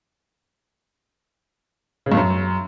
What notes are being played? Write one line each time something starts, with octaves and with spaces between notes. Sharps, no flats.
C#3
G2
F#2